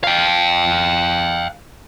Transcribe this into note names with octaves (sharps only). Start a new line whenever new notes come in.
F5 G5